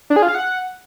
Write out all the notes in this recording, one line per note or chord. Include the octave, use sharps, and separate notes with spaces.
D4
G#4
F4
F5
F#5